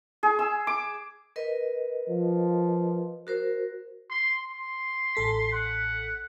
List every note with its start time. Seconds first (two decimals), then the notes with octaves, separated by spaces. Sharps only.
0.23 G#4
0.39 E6
0.67 D6
1.36 A#4 B4 D#5
2.09 F3
3.27 F#4 A#4 C5
4.10 C6
4.51 C6
5.15 A1 A4 B6
5.52 F#5